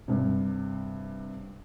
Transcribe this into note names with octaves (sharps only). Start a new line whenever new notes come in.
G2 C3